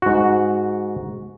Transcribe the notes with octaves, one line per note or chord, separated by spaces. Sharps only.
G#2 F#4